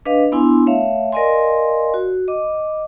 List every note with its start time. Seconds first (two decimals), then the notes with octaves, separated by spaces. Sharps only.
0.06 D4 B4 D#5 F5
0.32 B3 D4 E4 G#5 C6
0.66 A3 C#5 E5 F5
1.13 A#4 D5 D#5 F5 G#5 C6
1.94 F#4
2.28 D#5 D6